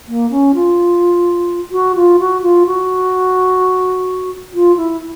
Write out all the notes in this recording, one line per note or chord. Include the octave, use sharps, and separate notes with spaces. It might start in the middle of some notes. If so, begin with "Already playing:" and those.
A#3
C#4
F4
F#4
F4
F#4
F4
F#4
F4
E4